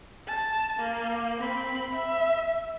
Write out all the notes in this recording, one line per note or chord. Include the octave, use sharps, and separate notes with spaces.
A5
A#3
C4 B5
E5